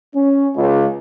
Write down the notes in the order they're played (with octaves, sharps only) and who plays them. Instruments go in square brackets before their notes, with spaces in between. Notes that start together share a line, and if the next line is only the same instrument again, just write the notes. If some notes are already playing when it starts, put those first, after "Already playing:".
[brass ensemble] C#4
C#2